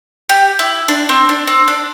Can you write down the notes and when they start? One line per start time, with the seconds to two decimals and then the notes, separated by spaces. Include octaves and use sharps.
0.29 G4
0.59 E4
0.88 D4
1.09 C4
1.29 D4
1.47 C4
1.68 D4